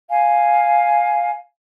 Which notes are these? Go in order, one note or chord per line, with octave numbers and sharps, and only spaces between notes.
F5 G#5